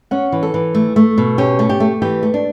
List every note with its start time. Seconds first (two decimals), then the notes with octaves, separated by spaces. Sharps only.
0.11 C#4 F#5
0.32 E3
0.43 A4
0.54 E3
0.75 A3
0.96 A3
1.18 B2
1.38 C#4 G4
1.59 A3
1.69 G4
1.80 A3
2.02 E3 G4
2.23 A3
2.34 D4